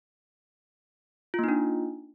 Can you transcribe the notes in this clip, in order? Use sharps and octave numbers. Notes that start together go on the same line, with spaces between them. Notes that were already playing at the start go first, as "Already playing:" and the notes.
A#3 D4 D#4 F4